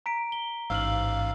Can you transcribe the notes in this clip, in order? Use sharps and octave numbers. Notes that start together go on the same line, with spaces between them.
A#5 B6 D7
G7
A1 G#2 F5 E6 F6 F#7